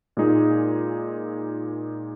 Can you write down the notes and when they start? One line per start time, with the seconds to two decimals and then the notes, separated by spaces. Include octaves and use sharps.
0.17 A#2 G#3 D#4 G#4